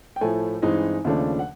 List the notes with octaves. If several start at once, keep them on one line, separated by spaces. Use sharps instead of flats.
G5
A2 F3 A3 G#5
G2 E3 G#3 C4 D#4
D#2 C#3 F3 A3 D4
F#5